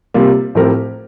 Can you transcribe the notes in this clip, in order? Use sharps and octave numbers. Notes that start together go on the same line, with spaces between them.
C3 G3 A#3 F4
A2 F3 C4 G4 A#4